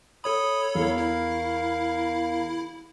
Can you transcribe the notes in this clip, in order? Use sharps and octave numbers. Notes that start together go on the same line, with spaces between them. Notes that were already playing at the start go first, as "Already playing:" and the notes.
A4 C#5 B5 D#6
E2 A#4 F5
E4